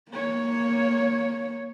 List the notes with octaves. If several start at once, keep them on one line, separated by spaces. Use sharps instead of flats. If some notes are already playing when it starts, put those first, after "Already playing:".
A#3 C#5